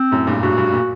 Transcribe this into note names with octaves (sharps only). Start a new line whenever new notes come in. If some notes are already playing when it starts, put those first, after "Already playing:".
Already playing: C4
F#2 A2
G2 A#2
G2 F#4
G2
A#2